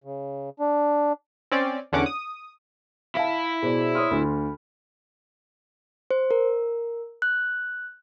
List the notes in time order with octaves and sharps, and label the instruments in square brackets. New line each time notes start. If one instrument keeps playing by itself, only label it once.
[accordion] C#3
D4
[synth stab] C4 C#4 D5
E2 D3 C#4 F#5 D6
D#6
[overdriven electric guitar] E4 E5 [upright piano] F5 A5
[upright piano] B2 [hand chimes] G#4 C5 D5
[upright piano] C#5 D#6 F6 [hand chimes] C6
[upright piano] D2 [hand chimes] B5
[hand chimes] C5
A#4
F#6